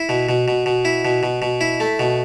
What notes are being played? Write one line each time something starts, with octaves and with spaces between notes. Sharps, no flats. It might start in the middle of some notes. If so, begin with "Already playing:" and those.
Already playing: E4
B2
B2
B2
B2
E4
B2
B2
B2
E4
A3
B2